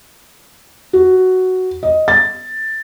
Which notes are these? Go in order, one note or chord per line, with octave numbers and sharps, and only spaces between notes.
F#4
D#5
A6